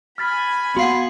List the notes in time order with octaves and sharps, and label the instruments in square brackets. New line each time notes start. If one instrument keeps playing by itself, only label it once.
[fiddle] G#5 B5 [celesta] F6 A6 B6
[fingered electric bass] B3 [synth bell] F#4 F5 F#5 [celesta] C6 C7